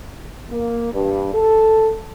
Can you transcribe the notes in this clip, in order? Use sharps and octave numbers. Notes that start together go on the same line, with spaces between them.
A#3
G2
A4